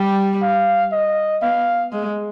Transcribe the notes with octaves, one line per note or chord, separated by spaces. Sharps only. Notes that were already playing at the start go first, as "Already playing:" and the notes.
Already playing: G3 G5
F5
D#5
B3 F5
G#3